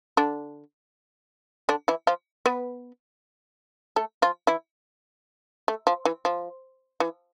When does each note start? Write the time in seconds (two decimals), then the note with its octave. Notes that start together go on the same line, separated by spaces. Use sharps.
0.17 D3 D4
1.69 D3 D4
1.88 E3 E4
2.07 F3 F4
2.46 B3 B4
3.96 A3 A4
4.22 F3 F4
4.47 E3 E4
5.68 A3
5.87 F3
6.05 E3
6.25 F3
7.00 E3